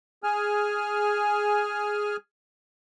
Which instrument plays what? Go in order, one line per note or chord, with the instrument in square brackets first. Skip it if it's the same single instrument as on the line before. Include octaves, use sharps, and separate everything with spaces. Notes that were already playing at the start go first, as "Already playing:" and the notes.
[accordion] G#4 G#5 F6